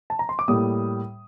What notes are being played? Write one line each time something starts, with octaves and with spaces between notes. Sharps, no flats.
A5
A#5
C6
D6
A2 G3 A#3 D#6